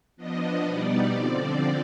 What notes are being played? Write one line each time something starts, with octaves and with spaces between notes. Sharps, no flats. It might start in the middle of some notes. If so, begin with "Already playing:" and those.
F3 B3 D4 D#5
B2 G3 B3 D#4 D5
D3 F3 C4